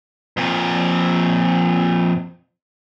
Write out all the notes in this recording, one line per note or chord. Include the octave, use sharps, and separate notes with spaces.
F2 A#2